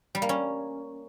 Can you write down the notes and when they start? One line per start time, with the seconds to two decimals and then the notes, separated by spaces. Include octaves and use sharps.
0.15 G3
0.22 A#3
0.29 C#4